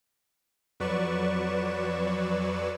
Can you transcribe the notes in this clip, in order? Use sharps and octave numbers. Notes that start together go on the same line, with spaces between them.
F2 F#3 B4 D5 C#6 E7